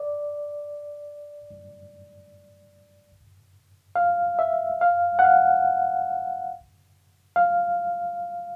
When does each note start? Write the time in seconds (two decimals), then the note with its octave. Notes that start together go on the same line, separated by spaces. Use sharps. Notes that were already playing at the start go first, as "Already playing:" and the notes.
Already playing: D5
3.96 F5
4.39 E5
4.81 F5
5.19 F#5
5.24 F5
7.36 F5